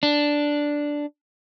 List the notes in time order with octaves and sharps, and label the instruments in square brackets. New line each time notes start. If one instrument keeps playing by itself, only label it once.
[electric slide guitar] D4